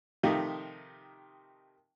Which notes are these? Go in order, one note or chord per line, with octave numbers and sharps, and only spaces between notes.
C3 D#3 F3 A3 D#4